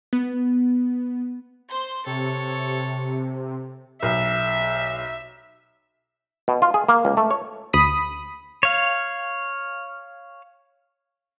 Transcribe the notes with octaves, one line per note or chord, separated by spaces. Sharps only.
B3
C5 C6
C3 A4 C#5
B1 E5
B2
F4
G#4
A#3
C#2
A3
C#5
D2 B5 D#6 B6
C#5 F5